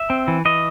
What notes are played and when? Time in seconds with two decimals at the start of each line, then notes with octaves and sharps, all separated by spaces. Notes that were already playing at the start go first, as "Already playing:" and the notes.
Already playing: E5
0.10 C4
0.28 E3
0.45 E3 D#5